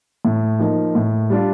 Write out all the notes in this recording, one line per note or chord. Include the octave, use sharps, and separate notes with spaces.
A2
F3 A#3 D#4
A2
G3 D4 F4